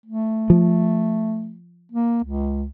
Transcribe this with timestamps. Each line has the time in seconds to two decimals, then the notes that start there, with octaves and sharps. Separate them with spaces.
0.06 A3
0.50 F3
1.92 A#3
2.24 C#2